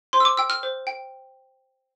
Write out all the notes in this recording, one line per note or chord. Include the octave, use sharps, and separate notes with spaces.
C5 C6
E6
D6
G5 E6
F6
C5
G5